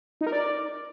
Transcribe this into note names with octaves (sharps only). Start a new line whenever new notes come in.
D#4
A#4
D5